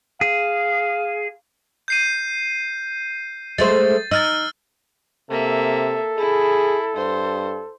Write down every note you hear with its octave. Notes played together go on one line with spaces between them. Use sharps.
G#4 F5
G6 C7 D#7
G#3 A3 C5 A6
D#4 E6 F6 A6
C3 A#3 A4 E5
E4 G#4
G2 C5